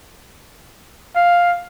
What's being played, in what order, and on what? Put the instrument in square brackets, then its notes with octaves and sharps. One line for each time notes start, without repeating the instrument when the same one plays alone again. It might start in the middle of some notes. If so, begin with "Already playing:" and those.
[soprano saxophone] F5